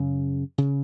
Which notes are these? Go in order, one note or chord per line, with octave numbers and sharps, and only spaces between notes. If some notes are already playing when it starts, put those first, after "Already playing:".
Already playing: F#2 C#3
C#3